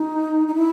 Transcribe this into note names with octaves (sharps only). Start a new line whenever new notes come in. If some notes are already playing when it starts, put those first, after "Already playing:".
Already playing: D#4
D#4
E4